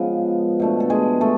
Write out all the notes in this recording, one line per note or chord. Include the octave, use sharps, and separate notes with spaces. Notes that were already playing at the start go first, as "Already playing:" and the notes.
Already playing: C#3 F3 G#3 B3 C#4 B4
B2 A3 D4
A4
G#3 G#4
A3 A4